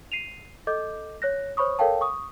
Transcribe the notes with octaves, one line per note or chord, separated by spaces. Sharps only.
C7 D#7 F7
A4 D#5 D6 G6
C#5 F#6 A#6
C5 C#5 B5 C#6 D#6
A4 A#4 C#5 F5 G5 A5
C#6 D#6